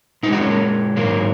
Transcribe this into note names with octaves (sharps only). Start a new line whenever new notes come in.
A#2 G#3 D#4
F#4
C#4
A#3
G#2 D#3 F#3 A#3